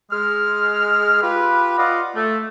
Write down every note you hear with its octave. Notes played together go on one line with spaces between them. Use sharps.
G#3 F6
F4 G4 B4
F4 D5 D#5 F5 F#5
A3